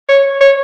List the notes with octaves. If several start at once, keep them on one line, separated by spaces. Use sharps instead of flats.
C#5
C#5